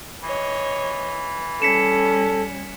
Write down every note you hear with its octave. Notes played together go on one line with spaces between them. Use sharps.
E3 C#5 D#5
G3 C#4 A4 B6 C#7 E7